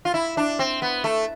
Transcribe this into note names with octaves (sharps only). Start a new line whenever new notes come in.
F4
E4
D4
C4
B3
A3